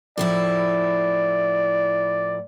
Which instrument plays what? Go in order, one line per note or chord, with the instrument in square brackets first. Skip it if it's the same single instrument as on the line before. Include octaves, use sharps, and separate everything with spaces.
[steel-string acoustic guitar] A2 F3 E4 [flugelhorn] D5